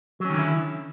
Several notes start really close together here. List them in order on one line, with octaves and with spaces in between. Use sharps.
F#3 C#4 D#3 D3 E4